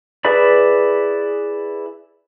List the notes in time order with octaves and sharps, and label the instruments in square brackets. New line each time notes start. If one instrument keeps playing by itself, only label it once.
[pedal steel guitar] E4 G#4 B4 D5 B5